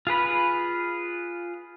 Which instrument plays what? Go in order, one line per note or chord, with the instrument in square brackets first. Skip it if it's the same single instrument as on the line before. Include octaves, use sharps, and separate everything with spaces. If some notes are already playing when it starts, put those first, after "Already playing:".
[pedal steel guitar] F4 G#4 B4 B5